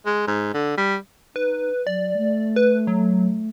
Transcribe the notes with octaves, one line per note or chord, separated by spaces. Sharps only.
G#3
G#2
D3
G3
D#4 B4
F#3 D5
A3
B4
F#3